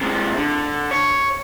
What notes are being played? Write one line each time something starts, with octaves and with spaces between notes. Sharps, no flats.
C3 G#3
D3
C#5